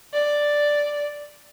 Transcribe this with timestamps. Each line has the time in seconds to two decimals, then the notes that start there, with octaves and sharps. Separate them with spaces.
0.13 D5